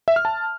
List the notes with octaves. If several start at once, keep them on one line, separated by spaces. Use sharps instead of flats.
E5
F6
A5